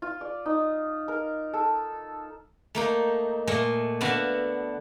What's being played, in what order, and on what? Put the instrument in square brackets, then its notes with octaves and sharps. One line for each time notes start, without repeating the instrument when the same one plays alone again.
[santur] F4
D5
D#4
A#4
A4
[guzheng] A3 A#3 D#4
A#2 A3 D#5
D3 B3 F#4 E5 F5 A5